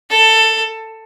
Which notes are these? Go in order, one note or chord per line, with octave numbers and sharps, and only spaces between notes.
A4